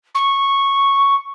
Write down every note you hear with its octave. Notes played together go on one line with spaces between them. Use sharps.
C#6